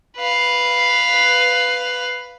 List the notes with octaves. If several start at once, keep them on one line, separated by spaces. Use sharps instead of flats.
B4 F5